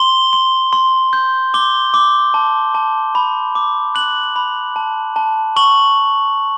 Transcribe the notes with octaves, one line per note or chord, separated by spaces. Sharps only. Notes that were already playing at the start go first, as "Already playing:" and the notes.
Already playing: C6 G7
C6
C6
G6
D6 G7
D6
A5
A5
B5
D6
F#6 F#7
B5
A5
A5
C#6 F#7